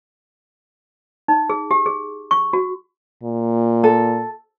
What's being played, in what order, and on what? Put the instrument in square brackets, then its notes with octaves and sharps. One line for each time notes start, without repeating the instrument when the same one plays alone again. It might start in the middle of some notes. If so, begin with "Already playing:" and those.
[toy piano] D#4
G#4
G4
G#4
C#6
F#4
[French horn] A#2
[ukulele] A4